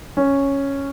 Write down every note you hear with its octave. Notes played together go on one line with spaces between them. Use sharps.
C#4